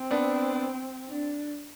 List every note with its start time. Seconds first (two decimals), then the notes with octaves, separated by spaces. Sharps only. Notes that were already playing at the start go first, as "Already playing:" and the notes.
Already playing: C4
0.11 B3 D4
1.08 D4